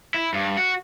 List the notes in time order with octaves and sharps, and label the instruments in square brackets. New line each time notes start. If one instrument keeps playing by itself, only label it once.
[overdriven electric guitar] E4
G2
F#4